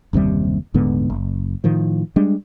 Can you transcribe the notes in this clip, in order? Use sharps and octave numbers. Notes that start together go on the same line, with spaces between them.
F#1 D#2 C3 G3
D#1 G#2 D3 B3
F#1
A2 D#3 F3
G3 G#3 D4